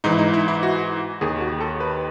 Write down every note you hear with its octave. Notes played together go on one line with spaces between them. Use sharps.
G#2 E3 D#4
E4
D#4
E4
E4
F#4
D#2 D#3 G#4
F#4
A4
B4